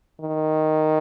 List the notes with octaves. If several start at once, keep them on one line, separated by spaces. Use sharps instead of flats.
D#3